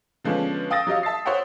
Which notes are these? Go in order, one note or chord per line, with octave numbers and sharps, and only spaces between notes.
D3 F3 G#3 B3 C#4 D4
F5 G5 D#6 E6 A6 A#6
F#3 G4 D#5 F5
E5 A5 A6 C7
C5 C#5 E5 F#5 G5